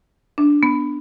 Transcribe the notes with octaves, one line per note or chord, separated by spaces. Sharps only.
D4
B3